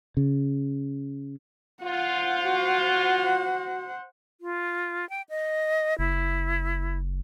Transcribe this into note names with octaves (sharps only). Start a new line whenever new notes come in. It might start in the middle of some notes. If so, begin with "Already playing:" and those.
C#3
F4 C5 F#5
F#4
F4
G5
D#5
F#1 E4